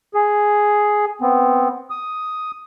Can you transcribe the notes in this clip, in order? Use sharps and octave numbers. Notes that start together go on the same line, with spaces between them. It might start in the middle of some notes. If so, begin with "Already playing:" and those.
G#4
B3 C4
D#6